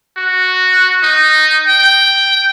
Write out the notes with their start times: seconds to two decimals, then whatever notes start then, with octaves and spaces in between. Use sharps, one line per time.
0.17 F#4
1.03 D#4
1.68 G5